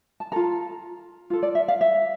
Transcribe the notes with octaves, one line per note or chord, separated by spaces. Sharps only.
A5
F4 A4 A#5
F4 A4
D5
E5
F5
E5